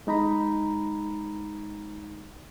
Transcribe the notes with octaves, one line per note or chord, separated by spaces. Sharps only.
G#3 D#4 A#5 B5